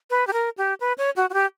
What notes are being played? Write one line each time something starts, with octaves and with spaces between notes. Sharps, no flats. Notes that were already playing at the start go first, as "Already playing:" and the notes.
B4
G4
A#4
G4
B4
C#5
F#4
F#4
G4